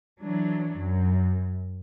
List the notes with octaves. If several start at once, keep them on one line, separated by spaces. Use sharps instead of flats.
E3 F#3 D4
F#2